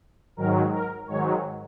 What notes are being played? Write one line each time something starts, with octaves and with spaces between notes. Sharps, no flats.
G#2 D#3 F#3 A#4
A#4
G#2 D#3 F#3 C#5